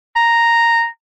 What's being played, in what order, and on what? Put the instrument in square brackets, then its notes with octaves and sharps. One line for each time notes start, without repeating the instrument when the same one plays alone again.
[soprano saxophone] A#5